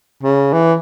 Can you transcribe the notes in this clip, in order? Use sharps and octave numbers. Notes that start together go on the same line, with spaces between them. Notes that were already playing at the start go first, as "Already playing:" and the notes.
C#3
E3